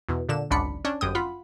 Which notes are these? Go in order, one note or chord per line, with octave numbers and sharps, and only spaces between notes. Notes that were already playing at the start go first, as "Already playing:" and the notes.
E2 B2
A#2 D3 E7
G#1 C#2 F#2 D4 B5 C#7
C#4 D4
G1 F#2 G5 D#6
F4 F#5 B5